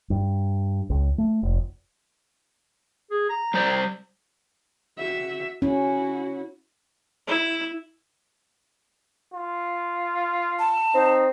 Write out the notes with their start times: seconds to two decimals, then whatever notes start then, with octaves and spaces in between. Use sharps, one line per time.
0.10 G2
0.90 C#2
1.18 A3
1.43 F1
3.11 G#4
3.30 A#5
3.54 G3 C5 D5
4.98 F#4 E5
5.62 C#4 E4 F#4
7.27 E4
9.34 F4
10.59 A5
10.94 C4 D#4